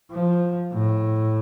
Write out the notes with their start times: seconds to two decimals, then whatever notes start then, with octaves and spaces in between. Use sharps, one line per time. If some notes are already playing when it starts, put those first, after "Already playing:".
0.11 F3
0.73 A2